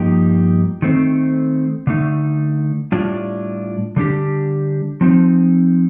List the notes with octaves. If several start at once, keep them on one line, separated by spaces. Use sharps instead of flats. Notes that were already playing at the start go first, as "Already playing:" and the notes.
Already playing: G2 F3 A#3 D#4 G4
D#3 A3 C4
D3 A3 D#4
A2 G3 D4 F4
D3 G3 D4 G4
F3 C4 D#4